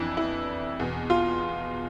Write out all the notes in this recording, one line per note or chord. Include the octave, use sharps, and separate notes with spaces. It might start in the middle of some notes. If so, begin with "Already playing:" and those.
Already playing: F2 E3 D4 E4
E4
E2 B2
F4